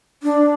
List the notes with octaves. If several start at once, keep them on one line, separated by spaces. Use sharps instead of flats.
D4